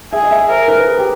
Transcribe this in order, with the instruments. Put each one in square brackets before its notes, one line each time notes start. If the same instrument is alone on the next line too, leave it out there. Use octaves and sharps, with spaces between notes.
[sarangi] G#4 [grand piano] E5
[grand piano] D#5
E5
[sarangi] A#4 [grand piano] C5
[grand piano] B4
G#4
G4